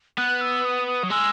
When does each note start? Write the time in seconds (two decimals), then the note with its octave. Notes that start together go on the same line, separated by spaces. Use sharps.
0.18 B3 F#6
0.41 E6
0.65 D#6
0.87 D#6
1.03 F#3
1.10 G#3 E6